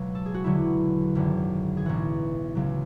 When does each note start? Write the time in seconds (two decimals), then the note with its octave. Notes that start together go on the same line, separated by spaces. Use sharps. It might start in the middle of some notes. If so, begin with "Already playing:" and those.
Already playing: C#2 B2 F#3 F#4
0.15 A4
0.26 G#4
0.34 F#4
0.44 E2 D3 F#3 E4
1.15 G#1 F#2 D3
1.77 G#4
1.85 B1 A2 E3 F#4
2.55 C#2 C#3 F#3